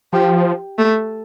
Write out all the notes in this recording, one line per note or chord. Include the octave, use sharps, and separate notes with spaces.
F3 G4
A3